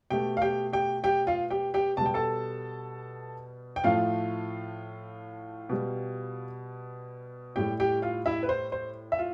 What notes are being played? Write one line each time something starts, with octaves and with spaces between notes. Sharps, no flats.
B2 A3 G4 G5
F5
G4 G5
G4 G5
G4 G5
F4 F5
G4 G5
G4 G5
B2 G3 A5
G5
A4 A5
G5
A2 F3 A3 F4 F5
B2 G3
A2 G3 G4 G5
G4 G5
F4 F5
E4 E5
B4
C5
C5
E5
F4